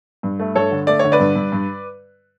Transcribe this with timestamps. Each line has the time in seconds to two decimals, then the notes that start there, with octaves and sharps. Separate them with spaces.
0.23 G2
0.39 A3
0.55 G2 A4 C#5
0.71 D3
0.87 A3 D5
0.99 D3 C#5
1.12 B4 D5
1.20 G2
1.36 G2
1.52 G2